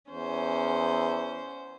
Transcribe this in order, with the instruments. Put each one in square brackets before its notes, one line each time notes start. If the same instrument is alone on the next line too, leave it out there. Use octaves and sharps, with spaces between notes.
[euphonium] E2 [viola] C#4 C5